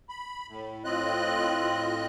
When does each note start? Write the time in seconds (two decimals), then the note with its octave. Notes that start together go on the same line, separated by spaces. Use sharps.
0.09 B5
0.48 A2
0.84 A2 C4 F4 D#5 F#6